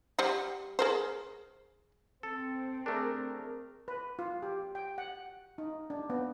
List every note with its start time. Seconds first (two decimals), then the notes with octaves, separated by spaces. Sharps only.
0.19 G3 C5 F#5
0.79 G#4 A#4 C5
2.23 C4 A4
2.86 A3 D4 G#4 A#4
3.88 B4
4.19 F4
4.42 G4
4.75 G5
4.98 F#5
5.58 D#4
5.90 D4
6.10 B3